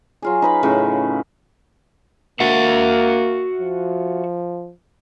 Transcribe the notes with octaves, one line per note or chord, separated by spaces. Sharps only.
F#3 F4 G#4
D#4 B4 B5
A2 C#3
A#3 F#4 E5 F#5
F3